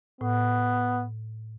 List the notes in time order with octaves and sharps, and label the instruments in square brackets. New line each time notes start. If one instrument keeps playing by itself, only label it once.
[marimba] A2 [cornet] B3